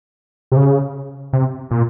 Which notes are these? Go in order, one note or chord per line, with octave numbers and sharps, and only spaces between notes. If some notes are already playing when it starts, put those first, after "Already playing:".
C3
C#3
C3
A#2